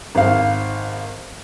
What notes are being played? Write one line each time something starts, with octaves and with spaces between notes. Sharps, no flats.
G#1 F5